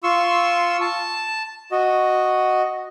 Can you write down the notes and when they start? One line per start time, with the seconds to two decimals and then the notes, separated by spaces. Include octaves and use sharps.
0.03 F4 C6 C#6 E6
0.81 A5
1.72 F#4 D#5